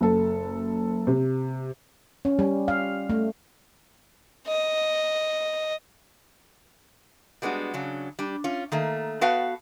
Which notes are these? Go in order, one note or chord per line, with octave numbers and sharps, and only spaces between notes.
F#1 A4
C3
C#4
G3
F5
A3
D#5
G3 G#3 B3 D4 F#4
C#3 F#3 D4
G3 D4
C#4 F4
D#3 A3 A#3
B3 F#4 B4 F5 F#5 A5